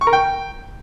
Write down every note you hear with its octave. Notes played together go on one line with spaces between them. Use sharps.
C#6
A#4
G5